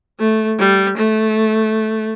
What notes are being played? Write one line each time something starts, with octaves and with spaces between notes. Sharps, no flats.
A3
G3
A3